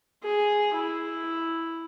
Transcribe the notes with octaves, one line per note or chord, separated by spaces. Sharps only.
G#4
E4